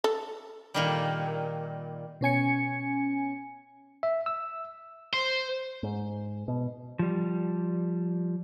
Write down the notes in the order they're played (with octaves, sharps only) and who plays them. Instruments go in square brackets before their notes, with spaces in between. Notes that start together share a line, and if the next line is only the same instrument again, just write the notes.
[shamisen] A4
[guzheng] A#2 D#3 G3
[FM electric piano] B2 C#4 G#5 C#7
[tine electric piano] E5
E6
[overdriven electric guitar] C5
[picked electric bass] G#2
B2
[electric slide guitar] F3 G3